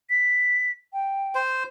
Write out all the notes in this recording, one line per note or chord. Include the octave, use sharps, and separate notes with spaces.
B6
G5
C5